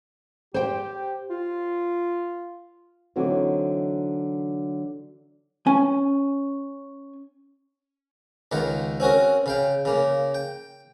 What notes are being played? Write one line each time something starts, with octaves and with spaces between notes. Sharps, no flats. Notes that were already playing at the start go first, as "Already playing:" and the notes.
G4 C5 G5
F4
D3 E3 F#3 C4 D#4 F#4
C#4 G#5
C#2 D#3 F4 F#5
C4 C#4 F#4 A#4
C#3 F5 G5
C#3 A#3
G5